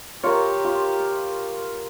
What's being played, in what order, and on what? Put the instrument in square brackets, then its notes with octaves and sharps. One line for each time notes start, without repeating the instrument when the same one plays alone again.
[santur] F4 A#4 [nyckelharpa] G4 [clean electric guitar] C#5
[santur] F4